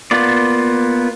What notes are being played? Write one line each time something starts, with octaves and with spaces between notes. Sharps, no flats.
A#3 B3 F4 D5